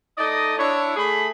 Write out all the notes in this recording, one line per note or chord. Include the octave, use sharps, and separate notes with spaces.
A3 D#4 D5 D#5
D4 E4 C#5
A3 G#4 B5